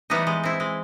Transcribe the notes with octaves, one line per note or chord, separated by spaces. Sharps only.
E3 G3 B3 D#4
G#3
C4 E4
G#3